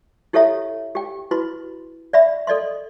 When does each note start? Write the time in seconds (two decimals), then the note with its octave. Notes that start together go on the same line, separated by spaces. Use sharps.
0.33 E4 G4 A4 C#5 E5 A#5
0.95 G4 G5
1.31 E4 F#4 B4 B5 C6
2.13 D5 E5 B5
2.47 A4 D5 D#5 C6